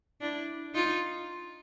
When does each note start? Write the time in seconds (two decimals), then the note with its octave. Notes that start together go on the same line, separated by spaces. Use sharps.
0.21 D4 E4
0.74 D#4 F4